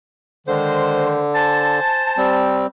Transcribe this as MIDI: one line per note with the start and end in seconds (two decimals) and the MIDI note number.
0.47 1.80 50
0.47 1.23 51
0.47 1.23 56
0.47 1.23 72
1.35 2.58 72
1.35 2.58 80
1.35 2.58 81
2.17 2.67 55
2.17 2.67 60